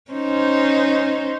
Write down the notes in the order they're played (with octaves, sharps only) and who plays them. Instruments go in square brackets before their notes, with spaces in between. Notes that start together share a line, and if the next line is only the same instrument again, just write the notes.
[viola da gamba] C#4 D#4 C5